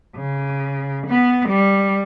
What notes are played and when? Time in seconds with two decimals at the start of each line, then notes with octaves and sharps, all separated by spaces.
0.16 C#3
1.07 B3
1.49 G3